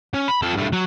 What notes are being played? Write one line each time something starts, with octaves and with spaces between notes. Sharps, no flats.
C#4
B5
F2 A4
G2 A3
F#3